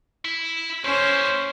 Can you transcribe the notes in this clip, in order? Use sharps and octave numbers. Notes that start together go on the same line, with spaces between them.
E4
A#3 C#4 E4 C5